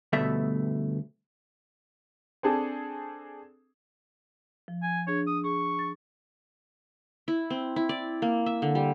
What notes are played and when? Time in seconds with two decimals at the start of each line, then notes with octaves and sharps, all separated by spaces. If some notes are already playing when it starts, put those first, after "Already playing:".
0.13 D2 G2 B2 A3 E5
2.43 C4 D4 G#4 A4
4.68 F3
4.83 G#5
5.07 D4 G#4 C#5
5.27 D#6
5.44 G#4 C#6
5.79 A6
7.28 E4
7.50 C4
7.76 E4
7.89 D5
8.22 A#3
8.46 E5
8.62 D3
8.75 G3